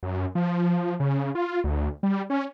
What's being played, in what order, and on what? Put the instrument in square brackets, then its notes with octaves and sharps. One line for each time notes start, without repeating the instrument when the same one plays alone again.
[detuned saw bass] F#2
F3
C#3
F4
D2
G3
C#4